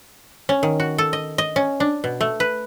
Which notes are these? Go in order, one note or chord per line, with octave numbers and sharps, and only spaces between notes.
C#4
D#3
F#4
A4
D#5
D#5
C#4
D4
B2
A3
B4